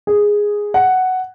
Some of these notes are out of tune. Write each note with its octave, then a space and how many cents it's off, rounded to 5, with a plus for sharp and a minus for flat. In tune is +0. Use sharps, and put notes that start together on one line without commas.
G#4 -5
F#5 +5